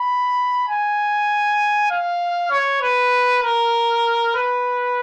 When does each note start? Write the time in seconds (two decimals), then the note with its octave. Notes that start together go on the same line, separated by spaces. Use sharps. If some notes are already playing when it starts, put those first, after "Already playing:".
Already playing: B5
0.68 G#5
1.90 F5
2.51 C#5
2.82 B4
3.43 A#4
4.35 B4